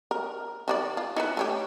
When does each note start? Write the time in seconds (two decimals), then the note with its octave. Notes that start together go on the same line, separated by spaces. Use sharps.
0.11 A#4
0.68 D#3 F4 D5
0.97 F4
1.16 D#4 E4 B4
1.37 A3 C#4 G4